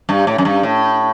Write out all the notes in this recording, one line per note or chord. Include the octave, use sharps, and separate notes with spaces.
G2
A2
F#2
G2
A2